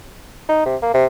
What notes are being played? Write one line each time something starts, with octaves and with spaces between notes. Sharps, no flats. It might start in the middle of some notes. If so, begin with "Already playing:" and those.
D#4
C3
A#3
C3